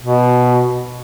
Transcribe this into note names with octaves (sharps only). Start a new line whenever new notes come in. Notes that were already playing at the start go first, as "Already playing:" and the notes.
B2